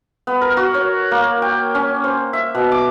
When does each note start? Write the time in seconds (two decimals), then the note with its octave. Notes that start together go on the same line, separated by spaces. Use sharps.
0.27 B3
0.41 A#4
0.57 F#4
0.74 C#5
1.11 A#3
1.42 G5
1.75 C#4
2.04 C5
2.33 E5
2.55 B2
2.72 D6